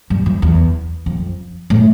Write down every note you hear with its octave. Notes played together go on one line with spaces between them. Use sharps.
G2
F2
E2
F2
A2